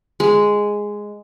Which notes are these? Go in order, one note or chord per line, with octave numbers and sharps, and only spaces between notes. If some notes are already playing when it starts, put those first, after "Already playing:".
G#3